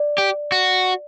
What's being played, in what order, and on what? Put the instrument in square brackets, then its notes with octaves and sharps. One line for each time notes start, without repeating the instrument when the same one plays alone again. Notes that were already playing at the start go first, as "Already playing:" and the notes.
Already playing: [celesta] D5
[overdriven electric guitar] G4
F#4